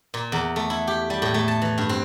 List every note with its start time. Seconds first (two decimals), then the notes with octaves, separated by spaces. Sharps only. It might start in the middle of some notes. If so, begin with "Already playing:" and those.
0.14 A#2
0.32 E2
0.56 A3
0.70 E4
0.87 G4
1.10 G3
1.22 A2
1.34 A3
1.48 A5
1.62 E3
1.78 G2
1.89 C4